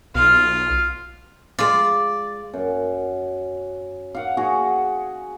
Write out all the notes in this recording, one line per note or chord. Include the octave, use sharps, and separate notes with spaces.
B1 F4 F5
G#3 F4 D5
F#2
F5 F#5
F#4 G#4